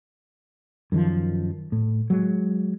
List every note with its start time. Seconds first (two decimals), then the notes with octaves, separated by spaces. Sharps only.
0.92 F#2 D#3 F3
1.72 A2
2.10 F#3 G#3